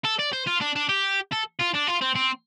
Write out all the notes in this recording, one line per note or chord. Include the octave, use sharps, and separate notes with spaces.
A4
D5
C5
F4
D4
D4
G4
A4
F4
D4
F4
C4
C4